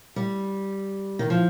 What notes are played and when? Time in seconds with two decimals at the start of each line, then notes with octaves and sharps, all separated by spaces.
0.16 G3
1.19 D#3
1.30 F3